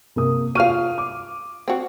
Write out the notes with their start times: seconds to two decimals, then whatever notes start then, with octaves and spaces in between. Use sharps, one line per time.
0.16 C3 A#3 D#6
0.55 F4 F#4 F5 F6 D#7
0.98 D6
1.68 C4 F#4